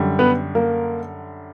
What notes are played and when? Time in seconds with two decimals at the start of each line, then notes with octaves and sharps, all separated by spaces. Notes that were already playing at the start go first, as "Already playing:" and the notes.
Already playing: F#2 D3 G3
0.19 B3 B4
0.55 A#3 A#4